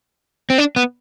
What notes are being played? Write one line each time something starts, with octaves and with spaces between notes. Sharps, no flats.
C4
D4
B3